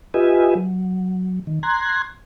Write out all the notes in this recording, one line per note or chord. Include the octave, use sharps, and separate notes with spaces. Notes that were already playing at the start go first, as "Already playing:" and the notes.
F4 G4 B4 D#5 E5 G#5
F#3
D#3
A#5 C6 F#6 G#6